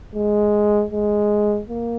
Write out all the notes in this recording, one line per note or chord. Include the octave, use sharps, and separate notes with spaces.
G#3
G#3
A#3